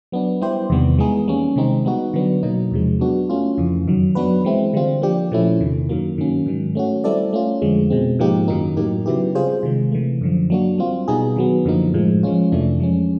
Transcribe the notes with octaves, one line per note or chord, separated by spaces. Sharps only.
F#3 B3 D4
G3 B3 E4 G4 C5
E2 C3 D#3 G3 B3
E3 G#3 B3 D#4 G#4
G3 A#3 C#4
C3 D#3 G#3 C4 D#4
G3 B3 D#4 F#4
D3 F#3 B3 D4
B2 F#3 A#3 D#4
E2 C3 F3 G#3
F#3 B3 D4 F#4
A3 C#4 F4
F2 C#3 E3
F#2 D#3 F#3
F#3 B3 D4 F#4 B4
E3 G#3 C4 E4
D3 G3 C4 F4
F3 A#3 D4 G4
A#2 F3 A3 C#4 E4
E2 C3 D#3
F#2 D#3 F#3 A#3
G2 D#3 F#3 A#3 C#4
G#2 D#3 F#3
A3 C#4 F#4
G3 C4 E4 A4 D5
A3 C#4 F4
F2 D3 F3 G#3
B2 G#3 C4
G#2 F3 A#3 D#4 G4
F#2 D#3 F#3 A#3 D#4
A2 F#3 A#3 D#4 G4
C#3 F#3 B3 E4 G4
G3 C4 F4 G#4 C5
C3 D#3 G#3
C3 E3 A3
F#2 D3 F3
F#3 A#3 D4 F#4
G3 C4 F4
B2 G3 B3 D#4 G#4
D#3 F#3 B3
F#2 D3 F3 A#3 D#4
A2 F3 G#3
F3 G#3 C#4 F4
F2 C3 E3 A3 D4
F3 G#3 C#4